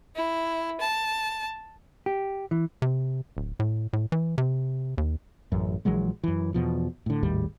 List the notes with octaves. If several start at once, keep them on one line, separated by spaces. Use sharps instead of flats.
E4
A5
G4
E3
C3
D1
A2
A2
E3
C3
D#2
A1 F#2
A#1 E3 F#3 G#3
F#2 E3
E2 B2 F3
A2 D3
G#1 D#2 A2 G3